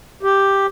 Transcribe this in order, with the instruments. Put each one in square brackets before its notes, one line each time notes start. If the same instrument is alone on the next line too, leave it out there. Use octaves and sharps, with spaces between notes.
[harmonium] G4